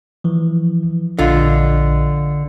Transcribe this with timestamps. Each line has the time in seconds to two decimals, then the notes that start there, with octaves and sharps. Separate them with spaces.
0.24 E3 F3
1.19 A#1 D3 F4 D#5